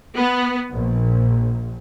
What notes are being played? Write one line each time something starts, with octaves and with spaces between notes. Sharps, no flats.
B3
A#1